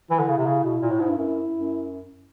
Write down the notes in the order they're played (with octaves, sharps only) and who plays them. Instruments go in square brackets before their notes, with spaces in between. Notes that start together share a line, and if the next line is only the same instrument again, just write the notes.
[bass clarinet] E3 [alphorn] E4
[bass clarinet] D3
C#3
C3
C#3
B2
A#2
A2
G#2
G2
[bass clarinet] F#2 [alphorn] E4
[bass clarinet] F#2